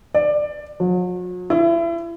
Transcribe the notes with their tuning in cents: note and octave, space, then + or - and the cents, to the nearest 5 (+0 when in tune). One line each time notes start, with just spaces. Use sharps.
D5 +15
F#3 -40
E4 +30